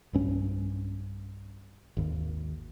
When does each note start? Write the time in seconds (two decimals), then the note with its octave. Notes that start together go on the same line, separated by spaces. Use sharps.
0.13 B1 G2 C#4
1.97 G#1 D#2